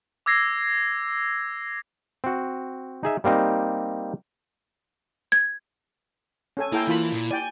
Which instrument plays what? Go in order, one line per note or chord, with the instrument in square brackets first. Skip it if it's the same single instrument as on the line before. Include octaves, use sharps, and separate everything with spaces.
[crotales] D6 E6 G#6 A#6 C7
[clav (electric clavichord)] C4 F#4
D#4 G#4 E5
G3 A#3 C4 D#4
[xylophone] G#6
[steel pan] C#4 A4 G#5
[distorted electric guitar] A#3 [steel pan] E4 A4 G5
[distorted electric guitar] E3 [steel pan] A#3 F4 B5 [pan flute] E4
[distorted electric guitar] A#2
[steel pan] D5 G5 [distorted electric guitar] G#5